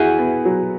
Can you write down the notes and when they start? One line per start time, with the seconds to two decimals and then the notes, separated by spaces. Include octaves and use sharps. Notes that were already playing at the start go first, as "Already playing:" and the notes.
Already playing: E4 F#4 G#4
0.19 B3
0.45 F#3